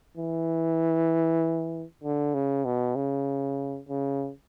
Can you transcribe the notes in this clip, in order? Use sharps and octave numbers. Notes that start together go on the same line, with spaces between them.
E3
D3
C#3
B2
C#3
C#3